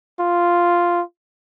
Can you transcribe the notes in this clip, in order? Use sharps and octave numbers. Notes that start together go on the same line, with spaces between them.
F4